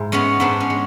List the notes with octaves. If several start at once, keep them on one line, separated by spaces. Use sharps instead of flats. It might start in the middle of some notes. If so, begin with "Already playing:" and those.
Already playing: G#2 E4 G#4
G#3 B3 C#4
G#2 B3 D4
C#4
G#3